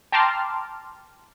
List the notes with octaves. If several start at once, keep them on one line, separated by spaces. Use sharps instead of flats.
G5 A5 A#5 C6 D6 F6